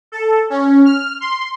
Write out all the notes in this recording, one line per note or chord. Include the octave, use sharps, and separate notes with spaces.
A4
C#4
F6
C6